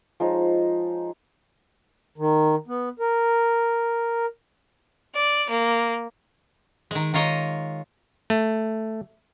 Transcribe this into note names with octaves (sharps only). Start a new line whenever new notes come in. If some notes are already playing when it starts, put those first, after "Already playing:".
F3 G#3 D#4 C#5
D#3
B3
A#4
D5
A#3
D#3 G#3
D#3 F4 C#5 D#5
A3